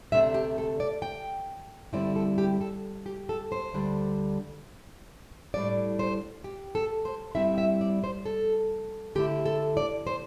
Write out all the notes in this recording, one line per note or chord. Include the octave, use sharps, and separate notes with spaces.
D2 C3 A3 D4 E5
G4
A4
D5
G5
G2 D3 G3 C4 E4 D5
A4
G4
A4
G4
A4
C5
D2 D3 G3 D4
A2 G3 D4 D5
C5
G4
A4
C5
G2 G3 C4 E4 E5
E5
D5
C5
A4
D3 A3 E4 G4
A4
D5
C5